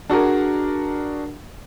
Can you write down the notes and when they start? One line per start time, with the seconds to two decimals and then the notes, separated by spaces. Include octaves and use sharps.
0.10 D4 F#4 G#4 A#4